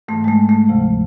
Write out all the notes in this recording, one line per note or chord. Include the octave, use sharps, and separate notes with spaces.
G#2 E3 A3
G#3
A3
A3
D2 C3 F3